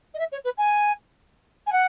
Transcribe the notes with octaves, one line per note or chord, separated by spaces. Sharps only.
D#5
E5
C#5
B4
G#5
G#5
F#5